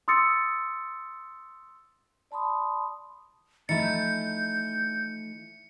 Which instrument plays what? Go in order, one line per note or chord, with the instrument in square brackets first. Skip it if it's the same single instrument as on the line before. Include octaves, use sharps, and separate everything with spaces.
[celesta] C6 D#6 E6 A6 C#7
[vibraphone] D5 A5 B5 C6 D#6
[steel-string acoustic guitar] E3 F3 A3 [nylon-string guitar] D#4 E4 [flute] A6 [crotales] C#7
[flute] G6